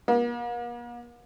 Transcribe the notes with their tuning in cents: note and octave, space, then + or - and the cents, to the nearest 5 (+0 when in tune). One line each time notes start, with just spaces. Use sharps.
A#3 +45